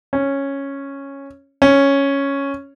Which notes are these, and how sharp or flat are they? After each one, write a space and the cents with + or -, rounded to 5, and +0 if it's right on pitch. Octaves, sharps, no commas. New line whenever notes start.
C#4 -5
C#4 +0